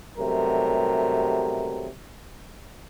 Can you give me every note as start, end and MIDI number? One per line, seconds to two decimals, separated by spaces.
0.18 1.88 35
0.18 1.88 48
0.18 1.88 54
0.18 1.88 55
0.18 1.88 57
0.18 1.88 70